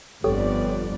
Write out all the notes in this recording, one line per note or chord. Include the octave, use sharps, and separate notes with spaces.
G1 F2 B3 F4 G4 A4 C#5 D5